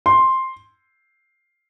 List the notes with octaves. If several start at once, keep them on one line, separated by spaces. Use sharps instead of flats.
C6